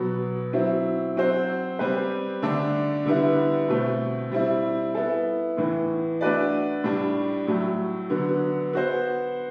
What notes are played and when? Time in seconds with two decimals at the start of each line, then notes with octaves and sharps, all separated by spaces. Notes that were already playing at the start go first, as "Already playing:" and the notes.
Already playing: B2 F#3 B3
0.53 F#3 C4 E4
1.16 F#3 C4 F#4 C5
1.79 G3 C4 G4 B4
2.42 D3 A3 D4
3.05 D3 G3 B3 E4
3.68 B2 A3 C4
4.32 G3 C4 E4
4.95 B3 E4 A4
5.57 A2 E3 B3
6.21 A3 D4 F#4 B4 D5
6.84 A2 G3 D4
7.47 A2 F#3 A3
8.10 D3 F#3 B3
8.73 B3 F#4 C5